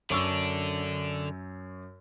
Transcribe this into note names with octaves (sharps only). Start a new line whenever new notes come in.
F#2 D3 D4 C#6 E6